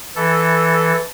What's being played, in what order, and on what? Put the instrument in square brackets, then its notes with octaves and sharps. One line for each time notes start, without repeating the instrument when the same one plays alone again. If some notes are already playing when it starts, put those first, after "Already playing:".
[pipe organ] E3 A4